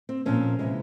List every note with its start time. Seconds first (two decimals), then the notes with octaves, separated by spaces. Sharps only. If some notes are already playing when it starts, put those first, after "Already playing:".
0.09 C4
0.26 A#2 F3 C4 C#4
0.59 C3 E3 G#3